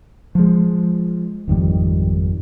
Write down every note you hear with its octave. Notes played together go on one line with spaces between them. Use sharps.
F3 G#3
G#1 F2 D#3 G3